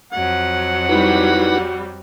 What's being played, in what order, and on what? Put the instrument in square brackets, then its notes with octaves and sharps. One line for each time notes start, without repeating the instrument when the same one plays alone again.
[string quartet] F2 F#3 [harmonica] F#5
[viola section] G3 F#4 [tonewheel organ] D#4 E4 B4